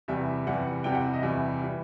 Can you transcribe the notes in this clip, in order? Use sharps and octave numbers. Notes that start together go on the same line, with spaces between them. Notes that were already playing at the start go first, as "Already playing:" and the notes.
E2 C3 E3 G3 E5
E2 C3 E3 G3 F#5
E2 C3 E3 G3 G5
F#5
E5
D#5
E2 C3 E3 G3 E5
E3 G3